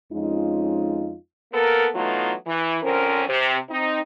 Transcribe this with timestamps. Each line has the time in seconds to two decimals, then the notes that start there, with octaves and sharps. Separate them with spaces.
0.12 F2 G#3 C#4 D#4 F4
1.53 A#3 B3 A4 A#4
1.94 E3 F#3 A3 B3 D#4 F4
2.46 E3
2.83 D3 F3 C4 C#4 A#4
3.29 C3
3.70 C4 D#4